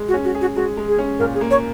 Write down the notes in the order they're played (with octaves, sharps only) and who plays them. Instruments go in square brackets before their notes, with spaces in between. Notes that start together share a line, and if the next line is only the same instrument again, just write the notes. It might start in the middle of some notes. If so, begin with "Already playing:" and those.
Already playing: [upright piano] G#3
[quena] F#4
[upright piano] C#4
[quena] F#4
[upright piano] G#4
[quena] F#4
[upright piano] G#3 [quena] F#4
[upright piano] G#3
[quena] G#4
[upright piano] C#4
[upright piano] A#2 [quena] A#4
[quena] G#4
[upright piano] A#3
[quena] C#5